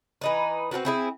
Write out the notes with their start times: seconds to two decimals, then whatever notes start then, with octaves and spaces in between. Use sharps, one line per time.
0.21 E3 D#4 B4
0.71 C4 D4 F#4 B4
0.85 C4 E4 G#4